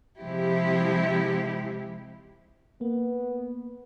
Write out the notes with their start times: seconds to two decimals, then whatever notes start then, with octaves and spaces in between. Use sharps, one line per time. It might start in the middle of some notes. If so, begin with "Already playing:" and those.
0.20 C3 F3 G#3 E4 G4
2.81 A#3 B3